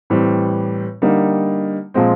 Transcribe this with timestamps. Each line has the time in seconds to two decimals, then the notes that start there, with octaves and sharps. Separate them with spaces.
0.10 A2 E3 G3 C4
1.02 D3 G3 A#3 D#4
1.94 A#2 F3 G#3 C4